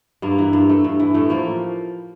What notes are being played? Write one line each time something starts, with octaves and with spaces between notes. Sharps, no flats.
G2 A#3
E3
G2
A3
G2
E3
A2 A3
F3 A#3